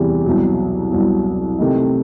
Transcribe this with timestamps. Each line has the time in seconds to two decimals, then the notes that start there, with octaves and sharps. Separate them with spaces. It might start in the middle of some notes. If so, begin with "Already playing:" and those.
Already playing: E2 C3 E3 G3
0.26 C2 B2 F#3
0.92 C2 B2 F#3
1.58 C3 D#3 A3 D#4